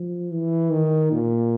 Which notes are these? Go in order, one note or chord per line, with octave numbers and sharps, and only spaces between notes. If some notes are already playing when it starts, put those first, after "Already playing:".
Already playing: F3
E3
D#3
A#2